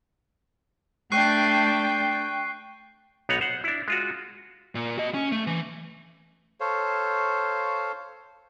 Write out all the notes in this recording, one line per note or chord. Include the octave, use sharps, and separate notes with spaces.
A3 D4 G5 C#6 F#6 C7
B1 B3 D#4 C#5 F#5 A#5
C5 F#5
D4 E4
G#3 F4 F#4
A#2
F#4 D#5
C#4
A3
E3
A4 C5 C#5 F5